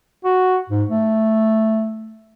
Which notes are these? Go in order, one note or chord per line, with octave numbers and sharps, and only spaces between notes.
F#4
G#2
A3